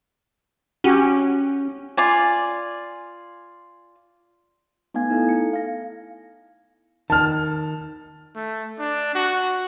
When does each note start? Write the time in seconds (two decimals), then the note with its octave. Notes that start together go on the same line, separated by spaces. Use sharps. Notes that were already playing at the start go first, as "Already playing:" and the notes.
0.84 C#4 F#4 G4
1.97 F4 D5 G#5
4.94 A3 B3 D#4 F5 G#5 G#6
5.10 D#4 E4 A4
5.29 C#7
5.53 F5 A#6
7.10 D#3 A5 F6
8.35 A3
8.79 D4
9.15 F#4